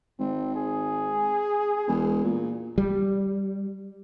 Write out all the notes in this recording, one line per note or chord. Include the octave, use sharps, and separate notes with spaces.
G#1 C4
G#4
E1
A#2
G3